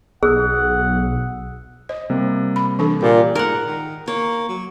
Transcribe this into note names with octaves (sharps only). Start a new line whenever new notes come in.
B1 G#4 F#5 D#6 E6 F#6
C5 D#5
C3 G3 A#3
B5
E3 D4 A4
A#2 G4 G#5
G#2 A#4 F#5
D#3
A#3 C#5
F#3